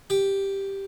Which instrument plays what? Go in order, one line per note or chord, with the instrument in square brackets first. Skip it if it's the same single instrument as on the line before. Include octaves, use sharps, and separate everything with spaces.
[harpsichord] G4